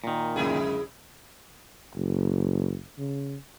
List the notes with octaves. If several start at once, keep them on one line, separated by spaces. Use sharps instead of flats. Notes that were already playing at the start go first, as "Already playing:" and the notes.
A#2 D#3
C#2 F#2 D3 E4 G#4
F#1
C#3